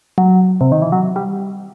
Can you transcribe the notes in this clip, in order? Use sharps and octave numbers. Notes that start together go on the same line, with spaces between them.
F#3
C3
D#3
E3
F#3
G3